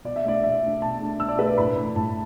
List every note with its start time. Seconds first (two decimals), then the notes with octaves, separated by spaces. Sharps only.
0.05 B2 D5
0.16 E5
0.24 A3 D4 D5
0.43 B2 E5
0.62 A3 D4
0.82 B2 A5
1.00 A3 D4
1.19 B2 E6
1.29 D5
1.39 A3 D4 B4
1.48 D5
1.57 A2 B5
1.77 E3 A3 D4
1.95 A2 A5